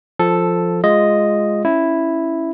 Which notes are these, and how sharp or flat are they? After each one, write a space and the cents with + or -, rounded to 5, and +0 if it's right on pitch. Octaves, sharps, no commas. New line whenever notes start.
F3 +0 A4 +0
G#3 +0 F4 +0 D#5 +0
C#4 +0 E4 +0